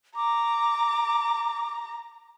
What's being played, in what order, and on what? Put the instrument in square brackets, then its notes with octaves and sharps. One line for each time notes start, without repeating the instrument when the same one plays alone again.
[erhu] A#5 [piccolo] D6